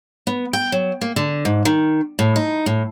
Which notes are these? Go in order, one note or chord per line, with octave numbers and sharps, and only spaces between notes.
B3
G5
F#3
A#3
D3
G#2
D#3
A2
D#4
A2